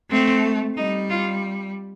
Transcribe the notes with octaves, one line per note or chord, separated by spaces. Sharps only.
A3 C4
G3 D#4
F4